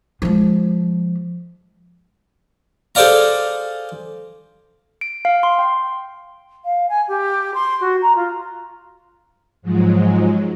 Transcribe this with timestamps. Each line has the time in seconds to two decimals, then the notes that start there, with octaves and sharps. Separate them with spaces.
0.22 F3 G#3
2.95 G#4 A4 C5 D5 F5 A#5
5.01 D7
5.25 F5
5.43 C6
5.59 G5
6.64 F5
6.89 G#5
7.08 G4
7.54 C6
7.80 F#4
8.01 A#5
8.15 F4
9.62 G#2 F3 F#3 G#3